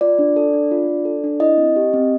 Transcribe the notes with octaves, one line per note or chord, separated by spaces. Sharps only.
F4 D5
D4
A4
D4
F4
D4
A4
D4
E4 D#5
C4
G4
C4